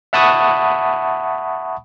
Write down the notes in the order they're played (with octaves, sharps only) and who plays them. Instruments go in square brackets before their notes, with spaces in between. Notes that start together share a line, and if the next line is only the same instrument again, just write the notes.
[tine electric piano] E5 F#5 A5 B5 C#6 D#6